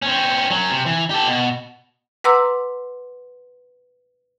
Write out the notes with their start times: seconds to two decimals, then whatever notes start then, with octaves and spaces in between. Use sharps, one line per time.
0.02 C4 C#4
0.50 F#3 C#4
0.70 C3
0.86 E3
1.10 G4 A4
1.28 B2
2.24 B4 F#5 A#5 C6 D6 E6